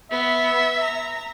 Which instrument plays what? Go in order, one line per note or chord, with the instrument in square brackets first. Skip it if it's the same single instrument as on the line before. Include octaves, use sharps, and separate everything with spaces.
[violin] B3 [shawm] E5
[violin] A#5